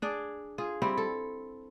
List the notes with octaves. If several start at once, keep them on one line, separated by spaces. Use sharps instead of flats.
D4 G#4 D5
F4 G#4
G3 C4 E4
A4